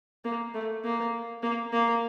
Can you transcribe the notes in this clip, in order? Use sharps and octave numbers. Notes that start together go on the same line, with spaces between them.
A#3
A3
A#3
A#3
A#3